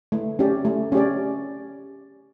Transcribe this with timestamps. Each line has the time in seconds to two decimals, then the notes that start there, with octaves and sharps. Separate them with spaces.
0.12 A3
0.39 C#4 G4 D5
0.65 A3
0.92 C#4 G4 D5